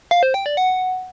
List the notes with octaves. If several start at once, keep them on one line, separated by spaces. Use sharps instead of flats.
F5
C5
G5
D5
F#5